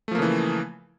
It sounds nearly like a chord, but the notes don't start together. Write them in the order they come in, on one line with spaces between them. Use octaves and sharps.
A3 F3 A#3 C#3 E3